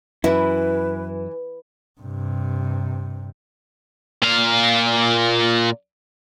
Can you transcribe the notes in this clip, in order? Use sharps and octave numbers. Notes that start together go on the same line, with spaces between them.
F#2 E3 E4 B4
G2 C3
A#2 F5